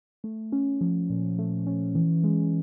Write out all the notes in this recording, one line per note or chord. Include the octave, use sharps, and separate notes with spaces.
A3
C#4
F3
A#2
A3
C#4
E3
G#3